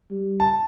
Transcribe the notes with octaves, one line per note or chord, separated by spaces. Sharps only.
G3
A5